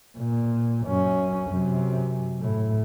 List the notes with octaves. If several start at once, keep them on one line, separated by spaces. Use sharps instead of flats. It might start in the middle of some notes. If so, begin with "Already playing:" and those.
A#2
F#2 C#4
F#2 C3
A2